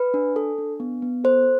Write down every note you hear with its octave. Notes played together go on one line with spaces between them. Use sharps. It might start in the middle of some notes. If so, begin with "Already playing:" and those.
Already playing: B4
D4
A4
D4
B3
B3
A4 C5